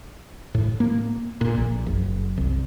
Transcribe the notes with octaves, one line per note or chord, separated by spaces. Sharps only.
A2
A#3
A#2
A#1
F#1
C2